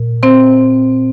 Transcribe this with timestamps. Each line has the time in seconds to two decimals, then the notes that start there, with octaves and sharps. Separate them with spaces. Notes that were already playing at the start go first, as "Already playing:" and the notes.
Already playing: A#2
0.23 C4 C5